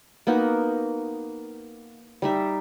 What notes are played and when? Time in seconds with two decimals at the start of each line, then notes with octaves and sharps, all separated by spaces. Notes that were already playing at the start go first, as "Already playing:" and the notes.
0.27 A#3 B3 D#4 F#4
2.22 G3 D#4 E5